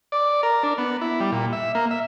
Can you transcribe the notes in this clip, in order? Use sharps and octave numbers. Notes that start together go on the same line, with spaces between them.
D5
A#4
D4
B3
E4
G3
A#2
E5
A#3
E5